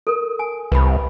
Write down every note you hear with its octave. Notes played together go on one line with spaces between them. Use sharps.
A4 A#4
G#5
C2 B4 B5